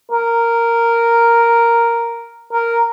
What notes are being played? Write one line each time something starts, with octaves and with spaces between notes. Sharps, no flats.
A#4
A#4